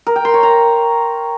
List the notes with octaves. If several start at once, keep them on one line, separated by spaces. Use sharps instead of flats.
A#4
G5
C6
C#5
A#5